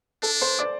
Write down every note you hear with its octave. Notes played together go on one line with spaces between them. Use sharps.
D4 A4
C5 C6
D5 D6